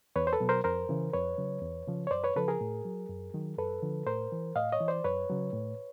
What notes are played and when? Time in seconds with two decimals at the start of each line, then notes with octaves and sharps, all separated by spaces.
0.16 E2 B4 C#5
0.27 C5
0.33 A4 B4
0.40 B2 F#3
0.49 A#4 C5
0.64 F2 A#4 C5
0.89 C#3 E3
1.13 F2 B4 C#5
1.38 C#3 F#3
1.62 E2
1.87 C#3 F3
2.07 C#5
2.11 F#2 C5 D5
2.24 B4 C#5
2.36 C#3 F3 A4 B4
2.48 G#4 A#4
2.61 A2
2.85 F#3
3.09 F#2
3.34 D#3 F#3
3.58 F#2 A4 B4
3.83 D3 F3
4.07 A2 A#4 C5
4.32 E3
4.55 A2 D#5 F5
4.72 C#5 D#5
4.80 E3
4.88 C5 D5
5.04 F#2 B4 C#5
5.30 C#3 F#3
5.53 A2